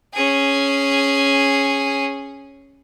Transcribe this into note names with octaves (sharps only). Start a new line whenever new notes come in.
C#4 G#4